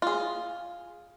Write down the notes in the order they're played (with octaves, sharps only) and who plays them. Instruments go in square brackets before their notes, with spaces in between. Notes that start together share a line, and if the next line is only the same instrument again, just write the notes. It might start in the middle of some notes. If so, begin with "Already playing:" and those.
[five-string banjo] F4 G#4